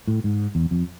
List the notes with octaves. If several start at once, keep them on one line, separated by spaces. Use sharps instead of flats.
A2
G#2
E2
F2